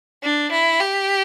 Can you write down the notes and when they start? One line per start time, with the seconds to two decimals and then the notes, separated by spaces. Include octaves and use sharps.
0.23 D4
0.52 E4
0.80 G4